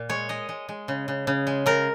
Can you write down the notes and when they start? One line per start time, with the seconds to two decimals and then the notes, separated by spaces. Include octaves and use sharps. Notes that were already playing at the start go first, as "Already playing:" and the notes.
Already playing: A#2
0.09 G#3 C#5
0.29 G#3 D#5
0.49 G#3
0.69 G#3
0.88 C#3
1.08 C#3
1.27 C#3
1.47 G#3
1.66 C#3 A#4